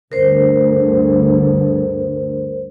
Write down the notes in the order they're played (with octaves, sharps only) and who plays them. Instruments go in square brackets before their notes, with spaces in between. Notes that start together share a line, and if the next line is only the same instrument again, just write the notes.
[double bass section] D2 G2 [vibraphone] A#4 C5